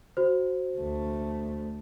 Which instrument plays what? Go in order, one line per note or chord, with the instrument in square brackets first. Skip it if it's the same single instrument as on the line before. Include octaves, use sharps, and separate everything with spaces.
[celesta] F#4 C5
[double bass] D2 A3